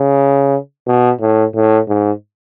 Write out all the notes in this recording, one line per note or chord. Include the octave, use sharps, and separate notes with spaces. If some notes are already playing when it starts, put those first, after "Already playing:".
Already playing: C#3
B2
A2
A2
G#2